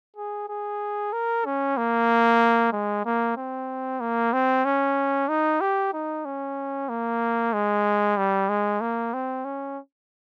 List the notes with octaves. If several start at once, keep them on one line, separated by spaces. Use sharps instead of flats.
G#4
G#4
A#4
C#4
A#3
G#3
A#3
C4
A#3
C4
C#4
D#4
G4
D#4
C#4
A#3
G#3
G3
G#3
A#3
C4
C#4